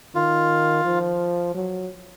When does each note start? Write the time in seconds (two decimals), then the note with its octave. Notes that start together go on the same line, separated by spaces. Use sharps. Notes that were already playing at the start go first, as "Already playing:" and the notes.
0.15 D#3 F4
0.85 F3
1.54 F#3